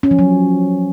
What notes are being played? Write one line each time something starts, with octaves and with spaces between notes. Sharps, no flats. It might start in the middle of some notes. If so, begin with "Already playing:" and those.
C#4
F3
F#3